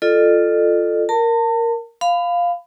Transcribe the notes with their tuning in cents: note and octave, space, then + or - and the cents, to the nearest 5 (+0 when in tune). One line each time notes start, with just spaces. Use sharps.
F4 +0 A4 +0 D#5 -45
A#4 +0 A5 +35
F5 +0 B5 +25